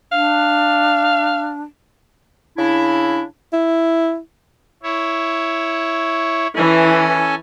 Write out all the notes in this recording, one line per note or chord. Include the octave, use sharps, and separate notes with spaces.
D4 F5
C#3 D4 E4
E4
E4 C#5
E3 C#4 A4 G#5